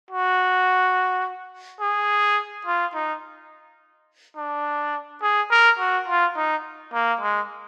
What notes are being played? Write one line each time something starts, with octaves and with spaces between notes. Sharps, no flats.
F#4
G#4
F4
D#4
D4
G#4
A#4
F#4
F4
D#4
A#3
G#3